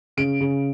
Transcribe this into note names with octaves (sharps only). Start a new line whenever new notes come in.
C#3 D7
C#3